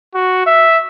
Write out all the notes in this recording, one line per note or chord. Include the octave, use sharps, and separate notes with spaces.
F#4
E5